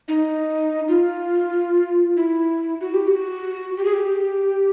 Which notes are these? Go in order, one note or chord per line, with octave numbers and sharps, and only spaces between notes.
D#4
F4
E4
F#4
G4
F#4
G4
G#4
G4